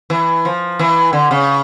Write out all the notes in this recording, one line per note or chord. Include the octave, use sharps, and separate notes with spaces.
E3
F3
E3
D3
C#3